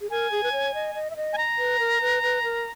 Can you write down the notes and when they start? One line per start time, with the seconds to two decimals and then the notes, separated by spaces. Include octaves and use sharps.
0.01 G#4
0.10 A#4 G#5
0.31 G#4
0.43 B4
0.52 C#5
0.74 D#5
0.95 D#5
1.10 E5
1.16 D#5
1.33 G#5
1.38 A#5
1.58 B4
1.79 A#4
2.01 B4
2.23 B4
2.43 A#4